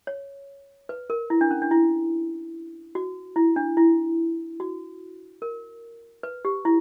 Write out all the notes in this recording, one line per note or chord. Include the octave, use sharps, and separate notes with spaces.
C#5
B4
A#4
E4
D4
C#4
D4
E4
F#4
E4
D4
E4
F#4
A#4
B4
G4
E4